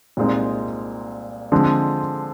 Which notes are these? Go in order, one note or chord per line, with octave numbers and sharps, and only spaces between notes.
C2 A#2 G#3 C4 D#4
D3 F3 G#3 C4